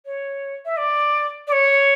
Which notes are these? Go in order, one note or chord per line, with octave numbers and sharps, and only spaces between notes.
C#5
E5
D5
D5
C#5